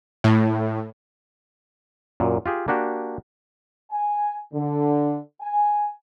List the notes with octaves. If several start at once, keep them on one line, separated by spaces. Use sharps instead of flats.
A2
F#2 A#2
F4 G4 G#4
A#3 D4 F#4 G4
G#5
D3
G#5